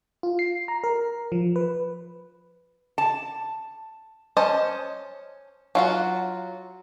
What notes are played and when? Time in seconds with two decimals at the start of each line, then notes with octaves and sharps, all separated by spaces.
0.23 F4
0.39 C7
0.68 A#5
0.84 A#4
1.32 F3
1.56 B4
2.98 A5
4.37 C#4 C5 D#5 A5
5.75 F#3 F4 F#4